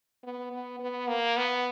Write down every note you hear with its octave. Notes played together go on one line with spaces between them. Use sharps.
B3
B3
B3
A#3
B3